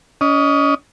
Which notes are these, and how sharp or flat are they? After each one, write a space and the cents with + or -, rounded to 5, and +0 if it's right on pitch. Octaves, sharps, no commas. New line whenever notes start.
C#4 +35 D#5 +0